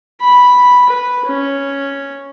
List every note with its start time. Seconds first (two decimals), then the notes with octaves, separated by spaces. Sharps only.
0.21 B5
0.89 B4
1.25 C#4